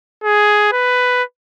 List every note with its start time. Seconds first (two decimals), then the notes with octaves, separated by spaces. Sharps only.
0.24 G#4
0.72 B4